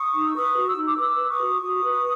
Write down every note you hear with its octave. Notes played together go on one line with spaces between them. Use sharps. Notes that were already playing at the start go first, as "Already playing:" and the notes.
Already playing: C#6 D#6
D#4
E6
B4 C#6 D#6
F#4
E6
D#4
D6 E6
B4 D6 E6
B4
C#6 D#6
F#4
D6
F#4 C#6 D#6
B4